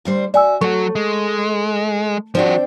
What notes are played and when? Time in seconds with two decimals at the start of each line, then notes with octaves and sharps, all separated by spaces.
0.05 D2 G3 C5
0.34 F#4 D5 E5 G#5 E6
0.61 F#3 A3 F#4 C#6
0.95 G#3
2.35 F3 C4 D4 F#4 G5